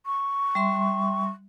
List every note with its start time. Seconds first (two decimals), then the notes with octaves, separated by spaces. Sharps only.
0.06 C#6
0.55 G3 E5 C6